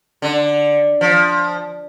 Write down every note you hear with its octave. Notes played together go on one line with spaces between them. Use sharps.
D3
F3